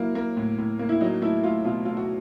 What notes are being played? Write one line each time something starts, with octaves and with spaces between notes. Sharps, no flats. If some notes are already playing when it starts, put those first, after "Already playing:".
Already playing: F#3 A#3 E4
A#3
A2
A2
A#3
E4
F#3 D#4
A3 E4
A3 F4
B2 F4
A3 F4
F#4